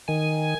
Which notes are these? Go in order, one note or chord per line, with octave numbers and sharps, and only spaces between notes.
D#3 G#5